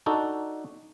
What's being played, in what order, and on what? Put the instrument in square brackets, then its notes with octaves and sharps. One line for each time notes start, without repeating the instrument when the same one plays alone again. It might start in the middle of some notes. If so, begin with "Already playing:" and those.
[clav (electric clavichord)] D4 D#4 F#4 A4